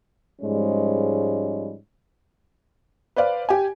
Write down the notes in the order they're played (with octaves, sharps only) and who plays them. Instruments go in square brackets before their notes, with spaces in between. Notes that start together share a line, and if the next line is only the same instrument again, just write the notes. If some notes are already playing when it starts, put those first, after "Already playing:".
[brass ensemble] G#2 F3 G3 G#3 C#4
[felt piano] B4 C5 D5 F5
G4 G#5